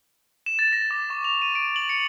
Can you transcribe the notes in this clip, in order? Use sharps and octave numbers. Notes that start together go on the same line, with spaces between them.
E7
A6
A#6
D6
C#6
F7
D#7
D7
F#7
C#7